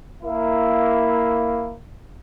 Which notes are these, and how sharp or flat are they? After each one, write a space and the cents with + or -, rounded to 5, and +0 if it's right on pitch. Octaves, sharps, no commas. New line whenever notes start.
A#3 +0 E4 +0